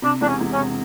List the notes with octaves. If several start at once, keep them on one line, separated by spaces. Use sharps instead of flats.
C3 D4
E1 D4
C#4
E1
C#4
C3